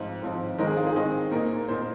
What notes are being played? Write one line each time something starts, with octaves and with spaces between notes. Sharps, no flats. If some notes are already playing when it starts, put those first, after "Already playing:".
Already playing: G#2 F3 C4
G#2 F3 C4
D#3 G#3 C4 D#4 A#4
G#4
F4
G#4
D#3 G#3 C4 D#4
A#2 A#3 D#4 A#4
A#2 A#3 D#4 C5